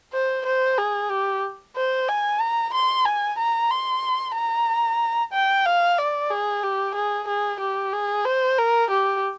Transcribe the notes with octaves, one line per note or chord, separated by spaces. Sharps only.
C5
C5
G#4
G4
C5
G#5
A#5
C6
G#5
A#5
C6
A#5
G5
F5
D5
G#4
G4
G#4
G#4
G4
G#4
C5
A#4
G4